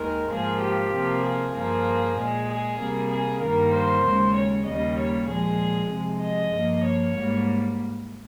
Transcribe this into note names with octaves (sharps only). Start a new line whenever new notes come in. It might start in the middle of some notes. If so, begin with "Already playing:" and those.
Already playing: D#2 D#3 G#3 A#4
G#2 F3 A#3 G#4
G4
C3 F3 A#3
G#4
G2 F3 A#3
A#2 G#3
G#4
C3 G3 A#3
G#4
G2 D#3 G3 A#3 A#4
C5
D#2 C#3 G#3
C#5
D#2 C#3 G3 A#3 D#5
C#5
A#2 F3 G#3 G#4
C3 F3 G#3
D#5
G2 F3 A#3
C#5
G#2 G3 A#3